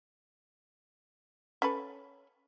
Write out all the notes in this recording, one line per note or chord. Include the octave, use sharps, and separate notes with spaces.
C#4 A4 B4